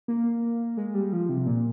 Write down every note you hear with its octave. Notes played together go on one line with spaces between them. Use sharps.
A#3
G#3
G3
F3
C3
A#2